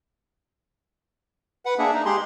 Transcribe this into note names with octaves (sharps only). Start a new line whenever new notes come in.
B4 F#5
A#3 D4 G#4 E5
D#4
G#3 G4 G#4 C6